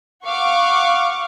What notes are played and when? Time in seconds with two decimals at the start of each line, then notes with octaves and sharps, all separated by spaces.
0.25 F5 F#5 C#6 D6